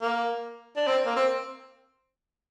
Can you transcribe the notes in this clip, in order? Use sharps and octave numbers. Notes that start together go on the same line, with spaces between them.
A#3
D4
C4
A#3
C4